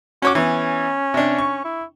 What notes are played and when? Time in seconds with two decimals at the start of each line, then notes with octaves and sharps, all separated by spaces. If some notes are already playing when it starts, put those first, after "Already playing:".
0.22 C#4 F#4 C#5 D6
0.35 E3 B3 C#4
1.14 C3 D4
1.38 C#6
1.64 E4